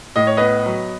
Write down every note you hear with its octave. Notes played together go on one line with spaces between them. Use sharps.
A2 D#5
C#5
B3 B4 D#5
F#3